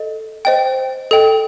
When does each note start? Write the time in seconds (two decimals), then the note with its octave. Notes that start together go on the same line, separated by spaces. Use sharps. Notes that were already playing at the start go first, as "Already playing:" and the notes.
Already playing: A4 D#5
0.45 C5 D#5 G5
1.11 A4 D#5 G5